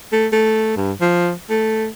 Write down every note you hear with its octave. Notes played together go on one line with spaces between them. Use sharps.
A3
A3
G2
F3
A3